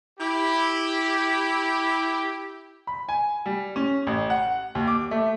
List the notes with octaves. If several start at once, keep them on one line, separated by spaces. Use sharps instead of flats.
E4 G4
B5
G#5
G3
C#4
A1
F#5
D#2
D6
A3